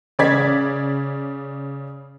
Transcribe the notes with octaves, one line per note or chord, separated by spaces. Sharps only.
C#3 D5 G#6 B6